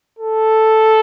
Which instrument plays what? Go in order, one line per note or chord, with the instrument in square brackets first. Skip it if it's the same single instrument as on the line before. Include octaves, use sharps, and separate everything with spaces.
[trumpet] A4